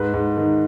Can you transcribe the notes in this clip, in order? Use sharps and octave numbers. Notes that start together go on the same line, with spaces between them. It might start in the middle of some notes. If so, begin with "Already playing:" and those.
Already playing: G#2 B4
G#2
D#3